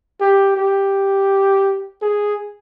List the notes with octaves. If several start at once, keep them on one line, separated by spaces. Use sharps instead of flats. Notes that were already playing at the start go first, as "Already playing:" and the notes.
G4
G4
G#4